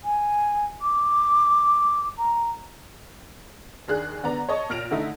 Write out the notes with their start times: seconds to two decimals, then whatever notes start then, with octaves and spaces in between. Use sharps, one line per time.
0.04 G#5
0.82 D6
2.17 A#5
3.88 D#2 D4 G#4 F#6
4.23 D3 B3 D5 A#5
4.49 C#5 D#5 A5 C#6
4.70 A#2 F6 A#6 D7 F7
4.91 D3 A3 D#4 E4